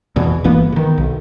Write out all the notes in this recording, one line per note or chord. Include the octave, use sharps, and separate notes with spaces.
E2 B2 E3
G1 E3 A#3 B3
D3 D#3
B1